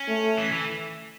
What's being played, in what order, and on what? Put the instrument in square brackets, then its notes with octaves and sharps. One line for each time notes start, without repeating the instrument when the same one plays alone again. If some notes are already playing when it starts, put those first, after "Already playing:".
Already playing: [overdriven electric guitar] C#4
[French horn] A3
[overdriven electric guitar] E3
E3